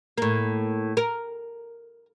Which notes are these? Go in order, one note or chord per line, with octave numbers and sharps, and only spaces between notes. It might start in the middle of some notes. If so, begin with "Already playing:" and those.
A2 A#3
A#4